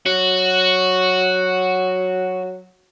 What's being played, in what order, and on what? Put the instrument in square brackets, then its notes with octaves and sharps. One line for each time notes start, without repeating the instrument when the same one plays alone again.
[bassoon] F#3 [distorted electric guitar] F#4